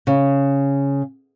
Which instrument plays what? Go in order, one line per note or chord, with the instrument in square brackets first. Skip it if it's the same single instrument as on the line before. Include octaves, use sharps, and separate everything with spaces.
[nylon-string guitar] C#3